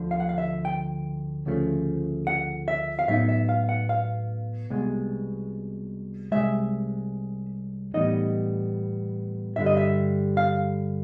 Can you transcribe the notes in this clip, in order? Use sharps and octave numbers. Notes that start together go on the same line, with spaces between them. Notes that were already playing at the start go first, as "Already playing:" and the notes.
Already playing: D2 D3 F3
F5
F#5
F5
E5
G5
D2 C#3 F3 A3
F#5
E5
F5
A2 F#3 B3 D#4 E5
E5
F5
F#5
F5
C2 B2 G#3
C2 B2 G#3 E5
A2 E3 G3 B3 D#4 D#5
G2 D3 G3 E5
D#5
E5
F5